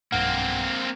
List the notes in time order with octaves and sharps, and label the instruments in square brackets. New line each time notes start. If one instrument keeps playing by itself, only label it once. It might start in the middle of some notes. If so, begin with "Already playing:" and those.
[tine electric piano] B1 G2 F#5 [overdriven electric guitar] A#3 C4